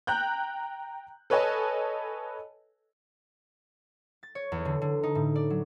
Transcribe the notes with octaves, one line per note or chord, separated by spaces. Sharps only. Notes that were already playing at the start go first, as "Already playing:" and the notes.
G5 A#5 F#6 G6
A4 B4 C#5 D#5 G#5 A5
A6
C#5
E2
D3
D3
D#4
A2
D5
F#3